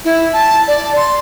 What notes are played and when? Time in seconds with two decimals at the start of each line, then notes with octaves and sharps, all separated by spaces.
0.05 E4
0.33 A5
0.68 D5
0.96 C6